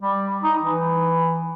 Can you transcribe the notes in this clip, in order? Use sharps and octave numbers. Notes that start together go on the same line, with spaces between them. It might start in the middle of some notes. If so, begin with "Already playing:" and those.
G3
D#4
E3